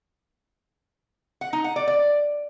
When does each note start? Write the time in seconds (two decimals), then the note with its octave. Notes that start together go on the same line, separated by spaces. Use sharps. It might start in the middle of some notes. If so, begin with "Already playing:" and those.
1.41 F#5
1.53 D#4
1.64 F#5
1.76 D5
1.88 D5